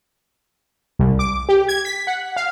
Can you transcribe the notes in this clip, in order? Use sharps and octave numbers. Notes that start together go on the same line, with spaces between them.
C2
D6
G4
G#6
B6
F#5
F5